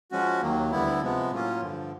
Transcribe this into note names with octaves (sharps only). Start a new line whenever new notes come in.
F3 G#3 C#4 F#4
D#2 D#3 F#3 A#3
D2 D3 G3 B3 E4
C3 F3 G#3 B3
A2 F#3 A#3 C#4 F4
G2 D3 F3